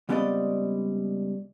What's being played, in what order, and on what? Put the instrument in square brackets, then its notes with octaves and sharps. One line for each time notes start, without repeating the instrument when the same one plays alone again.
[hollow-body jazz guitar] C#2 G3 B3 C4 D5 D#5